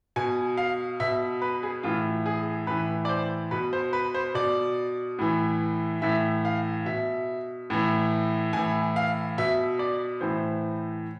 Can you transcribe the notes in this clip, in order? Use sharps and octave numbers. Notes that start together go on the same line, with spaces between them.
B2 G#5
F5
B2 E5
B4
G#4
A2 E3 F4
G#4
A2 E3 B4
D5
C5
B2 B4
C5
B4
C5
B2 D5
A2 E3
A2 E3 E5
F5
B2 E5
A2 E3
A2 E3 G#5
F5
B2 E5
D5
A2 E3 C5